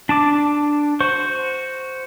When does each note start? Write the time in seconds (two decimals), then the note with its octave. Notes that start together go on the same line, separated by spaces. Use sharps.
0.09 D4 A5 D6
1.00 F#4 C5 C#6